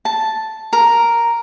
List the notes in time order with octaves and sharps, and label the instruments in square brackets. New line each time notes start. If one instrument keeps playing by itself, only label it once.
[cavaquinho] A5
A#4